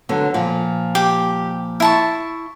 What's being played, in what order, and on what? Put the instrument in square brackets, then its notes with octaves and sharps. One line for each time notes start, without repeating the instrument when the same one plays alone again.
[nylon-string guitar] D3 F#3 B3
A#2 F3
[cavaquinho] G4
E4 A5 C#6